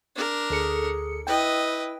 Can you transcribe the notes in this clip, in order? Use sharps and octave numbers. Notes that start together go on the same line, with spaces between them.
D4 A#4
D2 G#4 A4 C#7
E4 B4 D#5 G5